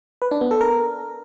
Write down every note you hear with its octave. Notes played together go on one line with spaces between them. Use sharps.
B4
D4
B3
A4
A#4